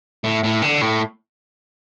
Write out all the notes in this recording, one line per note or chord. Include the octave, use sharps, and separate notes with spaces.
A2
A2
D3
A2